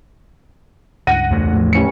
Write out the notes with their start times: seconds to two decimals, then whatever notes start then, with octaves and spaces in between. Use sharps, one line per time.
1.07 C#2 G2 F#5 A#6 D#7
1.31 E2 A3
1.53 A2 F3
1.73 F1 C#4 C#7